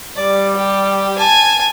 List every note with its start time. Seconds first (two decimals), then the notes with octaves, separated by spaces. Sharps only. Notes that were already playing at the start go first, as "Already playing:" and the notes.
0.16 G3 D5
0.56 G4
1.18 G#5 A5